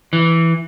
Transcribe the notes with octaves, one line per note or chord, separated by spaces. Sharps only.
E3